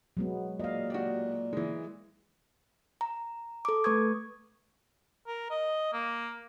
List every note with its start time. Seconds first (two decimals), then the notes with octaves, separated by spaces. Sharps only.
0.17 F#3 G#3 B3
0.60 A#2 D#5 F5
0.90 F#4 G4 D5
1.53 E3 G#3
3.01 A#5
3.65 A4 D6
3.84 A3 B4 C#6 D#6 G#6
5.27 A#4
5.50 D#5
5.93 A#3